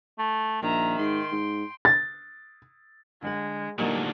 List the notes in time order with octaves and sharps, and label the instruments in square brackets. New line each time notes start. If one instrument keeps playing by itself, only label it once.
[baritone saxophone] A3
[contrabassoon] A#1 [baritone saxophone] D#3 [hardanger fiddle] E5 A#5
[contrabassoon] G#2 [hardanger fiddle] G5 C6
[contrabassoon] G#2
[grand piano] A6
[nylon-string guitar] D3 F#5 [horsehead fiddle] G#3
[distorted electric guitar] D2 A#2 [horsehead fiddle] F#3 D4 [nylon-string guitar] G3 A#3 D#4